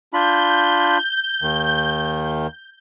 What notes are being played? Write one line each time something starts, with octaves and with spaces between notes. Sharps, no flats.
D4 F4 B5 G6
D#2 D#3